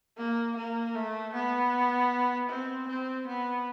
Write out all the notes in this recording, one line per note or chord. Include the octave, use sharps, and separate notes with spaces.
A#3
A#3
A3
B3
C4
C4
B3